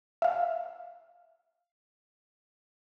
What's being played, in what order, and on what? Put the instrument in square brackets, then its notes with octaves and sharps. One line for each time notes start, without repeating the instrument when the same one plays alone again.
[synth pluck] E5 F5